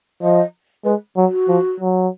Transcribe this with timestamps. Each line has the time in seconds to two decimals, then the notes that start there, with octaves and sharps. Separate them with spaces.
0.22 F3 D#5
0.85 G#3 B4
1.16 F#3
1.27 F#4
1.48 F3
1.80 F#3